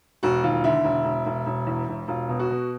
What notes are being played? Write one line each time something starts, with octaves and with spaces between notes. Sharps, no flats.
E1 F#4
D#2 F4
D3 E4
E1
E1
E1
E1
E2
E1
E1 F4
B2
F#4
B2